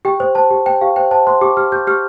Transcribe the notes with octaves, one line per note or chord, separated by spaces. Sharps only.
G4 G5
C5
C5 A5
G4
C5 G5
G4 F5
C5 G5
C5 A5
C5 C6
G4 D6
G4 F6
G4 G6
G4 F6